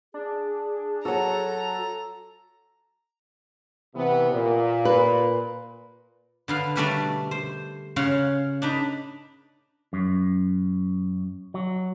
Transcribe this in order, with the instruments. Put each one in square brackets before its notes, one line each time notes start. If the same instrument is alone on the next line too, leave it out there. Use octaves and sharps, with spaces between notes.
[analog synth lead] D4 [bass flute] G#4
[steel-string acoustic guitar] F#3 F#4 [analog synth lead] A4 [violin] A#5
[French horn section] C3 E3 B3
A#2
[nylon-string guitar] B4
[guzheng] D3 B3 F5
B2 G3 A3 D4 D5 A#5
C5
C#3 C#4 F5 F#5 C6
D4 D#4 B4 A#5
[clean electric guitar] F#2
F#3